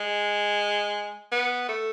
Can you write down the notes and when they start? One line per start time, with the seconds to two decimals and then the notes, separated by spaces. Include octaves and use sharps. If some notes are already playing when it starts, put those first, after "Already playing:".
Already playing: G#3
1.32 B3
1.69 A3